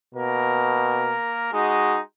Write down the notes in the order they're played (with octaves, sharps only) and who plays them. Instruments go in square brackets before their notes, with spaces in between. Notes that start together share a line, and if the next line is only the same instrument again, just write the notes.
[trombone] B2 [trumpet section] A#3 A#4
[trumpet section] G#3 D#4 [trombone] F#4